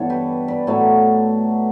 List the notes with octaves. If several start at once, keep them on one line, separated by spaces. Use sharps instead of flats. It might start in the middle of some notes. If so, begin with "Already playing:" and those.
Already playing: G2 E3 B3 A4 C#5
G4 B4
B4 D5
A2 F#3 A3 A4 C#5